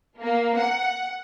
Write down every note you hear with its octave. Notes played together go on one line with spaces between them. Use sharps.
A#3
F#5